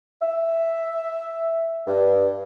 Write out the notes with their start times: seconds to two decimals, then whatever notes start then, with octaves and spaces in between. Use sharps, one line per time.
0.22 E5
1.87 G2